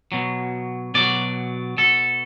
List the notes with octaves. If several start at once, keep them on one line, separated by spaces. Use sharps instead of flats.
B2 F#3
B2 F#3 D5
B2 A4